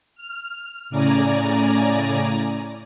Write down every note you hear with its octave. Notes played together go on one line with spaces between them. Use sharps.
F6
A2 C#3 D5 G#5 A#5